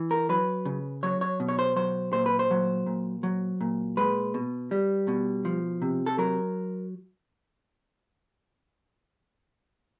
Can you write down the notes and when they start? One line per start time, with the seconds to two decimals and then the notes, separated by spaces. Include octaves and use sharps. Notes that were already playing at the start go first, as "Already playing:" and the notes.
Already playing: E3
0.11 A#4
0.29 F#3 B4
0.65 C#3
1.03 F#3 C#5
1.21 C#5
1.40 B2
1.49 C#5
1.59 C5
1.76 F#3 C5
2.13 A#2 C5
2.26 B4
2.39 C5
2.51 F#3
2.86 A#2
3.23 F#3
3.61 A#2
3.97 G#3 B4
4.34 B2
4.71 G3
5.08 B2
5.45 F3
5.82 C3
6.06 A4
6.18 F#3 A#4